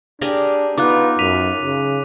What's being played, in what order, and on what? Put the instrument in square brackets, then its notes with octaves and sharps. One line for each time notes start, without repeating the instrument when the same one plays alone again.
[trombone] D4 [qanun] G4 G#4 A#4
[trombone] B3 [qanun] D#4 F4 [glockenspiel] D6 F#6
[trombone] F#2 [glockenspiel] B6 D#7 F7
[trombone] C#3